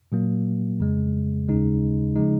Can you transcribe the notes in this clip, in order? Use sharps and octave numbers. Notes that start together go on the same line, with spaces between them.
A#2 F#3 A#3
F2 C#3 G#3
D#2 C#3 G#3 D#4
C#3 F3 G#3 D#4